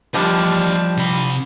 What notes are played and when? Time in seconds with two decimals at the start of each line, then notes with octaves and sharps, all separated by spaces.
0.14 F3 G3 D4 G4 D#5
0.97 C3 B5